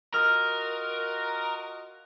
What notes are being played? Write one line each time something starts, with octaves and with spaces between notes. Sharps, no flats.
F4 F#4 A#4 D#5 F6